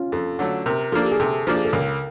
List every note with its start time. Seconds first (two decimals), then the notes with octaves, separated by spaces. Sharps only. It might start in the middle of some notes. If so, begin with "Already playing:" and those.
Already playing: C#4 F4
0.12 F2 A4
0.39 D3 F#3 A3
0.66 C3 A#4
0.92 F3 A#3 D4 A4
1.03 G4
1.11 G#4
1.20 C3 A4
1.47 F3 A#3 D4
1.56 G#4
1.65 A4
1.73 C#2 A#4